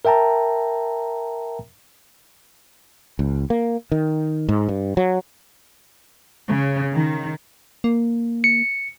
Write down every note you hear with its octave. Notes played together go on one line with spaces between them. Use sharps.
A#4 E5 G5 A5 A#5
C#2
A#3
D#3
G#2
G2
F#3
C#3
D#3
A#3
C#7